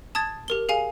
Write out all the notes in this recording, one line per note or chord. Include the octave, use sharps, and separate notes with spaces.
A5 D#6 G#6 A6
G4 A#4 G7
G#4 F5 G#5